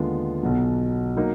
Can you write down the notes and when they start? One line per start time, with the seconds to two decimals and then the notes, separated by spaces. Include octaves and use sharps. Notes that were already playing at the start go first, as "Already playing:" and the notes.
Already playing: D#2 D3 G#3 B3 F4
0.43 B1 B2 F#3
1.17 F#3 A#3 D#4